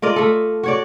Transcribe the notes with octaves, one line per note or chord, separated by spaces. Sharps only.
F4 A#4 D5 D#5
A3 A4
F#4 C#5 D5